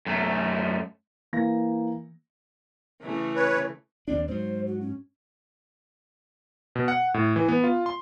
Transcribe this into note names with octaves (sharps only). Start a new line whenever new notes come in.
F#2 A3
E3 A#3 A#6
C#3 E3 A3
B4 C#5
D#2 C4 D4 D5
G#2 F#3 C5
F#4
C#4
B2
F#5
A2
E3
B3
F4
C6